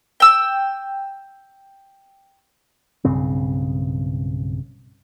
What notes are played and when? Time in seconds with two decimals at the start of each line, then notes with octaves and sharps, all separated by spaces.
0.20 G5 E6
3.05 B1 G2 C#3 C4